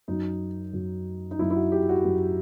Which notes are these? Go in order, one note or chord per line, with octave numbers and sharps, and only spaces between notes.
F#2 F#3 D#4
F#2 F#3
D#4
F#2 F#3 E4
E4
F#4
G4
F#4
F#2 F#3